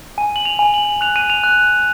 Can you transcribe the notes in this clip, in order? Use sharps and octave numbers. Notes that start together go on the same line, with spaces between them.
G#5 D#7
F#7
F7
G#5
F#7
F#6 F7
D#7
F7
F#6